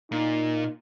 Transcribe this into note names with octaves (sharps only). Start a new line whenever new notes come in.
A#2 D#4